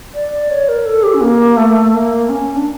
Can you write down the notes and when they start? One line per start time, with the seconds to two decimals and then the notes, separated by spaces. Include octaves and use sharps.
0.14 D5
0.50 C#5
0.68 A#4
0.85 A4
1.03 G4
1.14 C#4
1.21 A#3
1.57 A3
1.92 A#3
2.29 C#4
2.55 D4